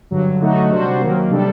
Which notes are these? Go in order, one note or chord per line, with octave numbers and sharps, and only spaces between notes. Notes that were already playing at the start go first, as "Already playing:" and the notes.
G2 D3 F#3
D3 F#3 A3 D#4 F#4
C3 G3 D4 F#4 C5
D#3 F#3 A#3
C3 G3 D4 A4